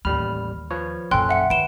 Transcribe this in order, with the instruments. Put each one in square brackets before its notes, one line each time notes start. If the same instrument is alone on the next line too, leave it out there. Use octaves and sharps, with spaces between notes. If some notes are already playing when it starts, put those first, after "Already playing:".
[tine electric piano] A1 G3 F6 [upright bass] D#2 [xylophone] B5
[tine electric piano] F3 B4 C#5
[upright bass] A#1 F#2 [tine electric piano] C#4 A4 [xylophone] G5 C6 F#6
[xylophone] E5 F#5 C#7
[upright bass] D#3 [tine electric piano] B4 [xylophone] D7 E7 G7